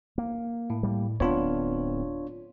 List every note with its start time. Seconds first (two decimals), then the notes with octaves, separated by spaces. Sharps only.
0.18 A#3
0.70 A2
0.83 G3 G#3 A#3
1.20 D1 B3 C4 D4 F4 C#5